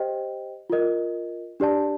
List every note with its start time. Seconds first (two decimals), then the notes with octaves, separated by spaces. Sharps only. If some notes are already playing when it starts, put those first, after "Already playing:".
Already playing: G4 C5 D#5 G5
0.70 F4 A#4 D#5
1.60 D4 G4 D5 A5